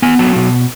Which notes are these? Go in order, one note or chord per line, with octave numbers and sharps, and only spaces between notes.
B3 G#5
F#3 A5
B2